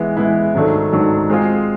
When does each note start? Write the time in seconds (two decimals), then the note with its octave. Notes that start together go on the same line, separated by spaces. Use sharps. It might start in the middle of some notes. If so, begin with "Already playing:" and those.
Already playing: E3 G#3 B3 E4
0.17 E3 G#3 B3 E4
0.54 G#2 D#3 F#3 A3 D4
0.92 G#2 D#3 F#3 A3 D4
1.30 G#3 C4 F4 G#4